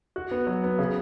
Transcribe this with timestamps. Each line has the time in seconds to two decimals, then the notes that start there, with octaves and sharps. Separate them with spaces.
0.16 F#4
0.31 B3
0.47 F#3
0.64 B3
0.79 C#3